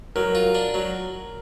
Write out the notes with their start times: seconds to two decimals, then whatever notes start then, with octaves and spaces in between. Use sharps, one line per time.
0.16 F#3 A#4
0.35 F4
0.55 D4
0.74 F#3